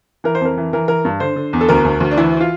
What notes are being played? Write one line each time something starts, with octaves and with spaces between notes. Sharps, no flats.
E3 A#4
C5
F2 A#4
E3
E3 A#4
E3 A#4
G2
D3 C5
D3
E2
A4
D2 A#4
D2
D2
D4
E3 E4
F4